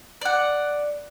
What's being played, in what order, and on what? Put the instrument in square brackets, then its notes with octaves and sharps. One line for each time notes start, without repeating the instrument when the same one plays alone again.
[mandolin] D5 F#5